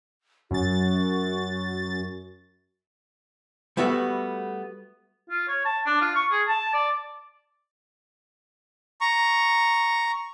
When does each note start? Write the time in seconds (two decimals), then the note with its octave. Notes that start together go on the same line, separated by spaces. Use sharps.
0.51 F#2 F#4 A6
3.77 G3 A3 B3 F#4 E5
5.30 F4
5.48 C#5
5.65 A5
5.86 D4
6.01 F4
6.15 C#6
6.31 G#4
6.47 A5
6.74 D5
9.01 A#5 C#6